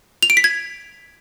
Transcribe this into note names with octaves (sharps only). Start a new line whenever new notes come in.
F7
D7
B6
G#6